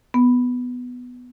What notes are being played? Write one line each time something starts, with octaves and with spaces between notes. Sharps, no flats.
B3